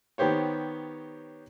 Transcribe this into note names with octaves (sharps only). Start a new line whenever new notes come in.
D#3 B3 G4 C5 C#5